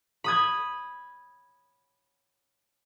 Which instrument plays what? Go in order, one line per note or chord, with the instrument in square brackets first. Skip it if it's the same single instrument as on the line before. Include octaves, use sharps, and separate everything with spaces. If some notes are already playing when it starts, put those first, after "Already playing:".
[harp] B5 D#6 G#6